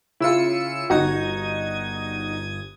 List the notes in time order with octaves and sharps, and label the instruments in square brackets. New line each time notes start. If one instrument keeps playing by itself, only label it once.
[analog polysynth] C#3 E6 C#7 [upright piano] E4 F4
[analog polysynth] G1 D#6 G#6 [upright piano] D#4 F#4